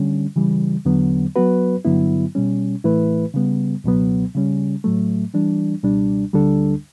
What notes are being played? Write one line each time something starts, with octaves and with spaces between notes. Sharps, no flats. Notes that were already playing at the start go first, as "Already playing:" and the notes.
Already playing: D3 G3 C#4
C#3 E3 G3
E2 D3 F#3 B3
F#3 B3 F#4 B4
G2 D3 F#3 B3 E4
B2 G3 C#4
A2 E3 A3 E4 B4
C#3 G3 B3
C#2 B2 F#3 B3
C#3 G3 C#4
A2 F#3 A3
E3 G3 D4
C#2 B2 G3 D4
D2 D3 G3 D4 A4